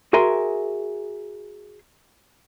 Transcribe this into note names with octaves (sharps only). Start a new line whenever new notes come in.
F#4 G#4 A#4 E5 G#5 C6